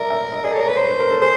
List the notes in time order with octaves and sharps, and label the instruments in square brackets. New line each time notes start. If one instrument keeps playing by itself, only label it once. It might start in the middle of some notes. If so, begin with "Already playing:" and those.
Already playing: [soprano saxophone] A#4 [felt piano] D5 E5
[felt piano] E5
D#5
[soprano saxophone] G#4 [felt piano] D5
[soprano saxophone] A4 [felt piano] C#5
[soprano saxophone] A#4
[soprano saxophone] B4 [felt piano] C#5
[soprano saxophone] C5 [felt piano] C#5
[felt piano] B4
A#4
A4
[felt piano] G#4 [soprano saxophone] C5